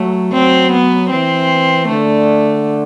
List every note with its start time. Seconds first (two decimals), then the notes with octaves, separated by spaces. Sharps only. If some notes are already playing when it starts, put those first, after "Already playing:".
Already playing: F#3 A3
0.33 F#3 C4
0.72 B3
1.10 E3 C4
1.88 D3 A3